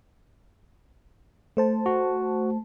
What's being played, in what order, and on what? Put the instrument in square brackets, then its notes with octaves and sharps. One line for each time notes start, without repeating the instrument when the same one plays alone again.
[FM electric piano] A3 C5 A5
[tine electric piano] F#4